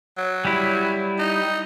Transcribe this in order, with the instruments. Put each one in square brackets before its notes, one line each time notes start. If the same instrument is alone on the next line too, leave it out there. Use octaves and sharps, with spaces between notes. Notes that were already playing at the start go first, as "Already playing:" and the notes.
[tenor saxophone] F#3
[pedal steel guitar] G3 E4
[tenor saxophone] D#4